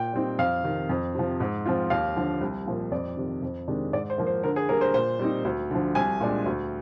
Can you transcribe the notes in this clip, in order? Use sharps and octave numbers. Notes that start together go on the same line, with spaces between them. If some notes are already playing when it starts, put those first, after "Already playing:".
Already playing: A#2 G5
G3 C4 D#4
F2 F5
C3 D#3
F2
C3 F3
G#2
F3 C4 F4
D#2 F5
D3 F3
C2
A#2 F3 A#3 F4
F2 D5
C3 D#3
F2
C3 D#3 G#3 D4
G#2 D5
C5
F3 A#3
C5
D3 A#4
G#4
G3 A#3 D4 A#4
C5
A#2 C5
G3 C4 D#4
D2
D3 F3
C2 G#5
A#2 G#3 D4
D2